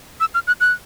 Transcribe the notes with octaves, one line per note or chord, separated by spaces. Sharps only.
E6
F6
F#6
F#6